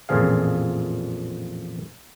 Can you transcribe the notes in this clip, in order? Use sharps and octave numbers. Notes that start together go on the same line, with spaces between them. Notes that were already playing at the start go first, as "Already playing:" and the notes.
A1 F2 A#2 F3 G#4 F5